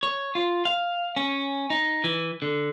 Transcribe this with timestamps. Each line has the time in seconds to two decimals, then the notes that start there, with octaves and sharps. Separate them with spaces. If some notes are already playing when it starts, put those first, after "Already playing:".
0.03 C#5
0.35 F4
0.65 F5
1.16 C#4
1.70 D#4
2.04 E3
2.42 D3